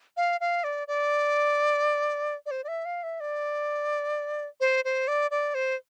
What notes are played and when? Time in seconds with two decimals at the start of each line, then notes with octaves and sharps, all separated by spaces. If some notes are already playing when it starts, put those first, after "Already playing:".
0.17 F5
0.41 F5
0.64 D5
0.88 D5
2.46 D5
2.51 C5
2.64 D5
2.68 E5
2.85 F5
3.03 E5
3.20 D5
4.60 C5
4.85 C5
5.08 D5
5.31 D5
5.54 C5